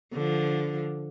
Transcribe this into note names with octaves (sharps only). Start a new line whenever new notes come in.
D3 F3